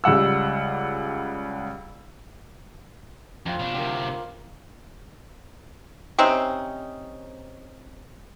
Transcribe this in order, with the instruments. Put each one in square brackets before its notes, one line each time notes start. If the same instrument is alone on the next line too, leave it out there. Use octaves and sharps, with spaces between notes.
[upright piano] C#2 G3 F#5 E6
[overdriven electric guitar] F2 [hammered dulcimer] F4 C5
[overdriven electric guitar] B2 D4
[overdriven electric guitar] D2 C3 [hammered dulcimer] A#4 G5
[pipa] C3 C4 C#4 D#4